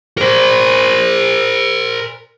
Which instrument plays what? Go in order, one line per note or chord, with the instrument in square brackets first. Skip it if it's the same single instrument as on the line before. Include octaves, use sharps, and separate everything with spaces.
[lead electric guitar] A#4 C5